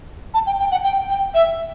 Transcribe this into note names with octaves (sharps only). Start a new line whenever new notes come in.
A5
G5
G5
F#5
G5
G5
E5